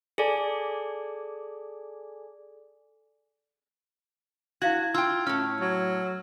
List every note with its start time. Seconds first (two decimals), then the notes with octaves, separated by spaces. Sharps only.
0.18 G#4 A4 D5 G#5
4.62 E4 F#4 F5 G#6 F#7
4.94 F4 G5 E6
5.27 A2 C#4 F6
5.61 F#3 G#6